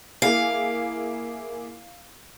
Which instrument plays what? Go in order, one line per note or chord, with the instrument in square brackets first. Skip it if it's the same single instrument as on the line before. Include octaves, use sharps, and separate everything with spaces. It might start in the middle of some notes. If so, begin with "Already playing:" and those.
[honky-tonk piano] A#3 E4 G#4 [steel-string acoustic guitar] F5